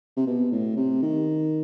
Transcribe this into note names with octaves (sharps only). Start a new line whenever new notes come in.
C3
B2
A2
C3
D#3